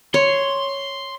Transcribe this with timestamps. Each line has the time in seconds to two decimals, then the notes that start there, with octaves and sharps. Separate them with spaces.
0.14 C#5 C6